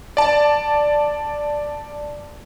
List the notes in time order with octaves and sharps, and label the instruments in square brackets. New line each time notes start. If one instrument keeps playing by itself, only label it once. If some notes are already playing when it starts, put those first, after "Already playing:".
[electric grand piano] D5 A5